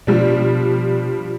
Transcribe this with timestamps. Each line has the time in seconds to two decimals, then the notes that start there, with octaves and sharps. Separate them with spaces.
0.07 B2 F3 G3 D4